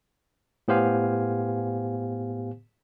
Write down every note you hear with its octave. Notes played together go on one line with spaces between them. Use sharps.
A2 B3 G4 C5 F5 G#5